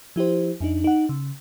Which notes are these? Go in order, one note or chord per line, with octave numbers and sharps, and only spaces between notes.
F3 E4 G4 C5
F2 D4 D#4
D#4 F#5
C#3